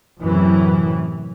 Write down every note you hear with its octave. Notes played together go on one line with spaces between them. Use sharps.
F#2 A2 C3 E3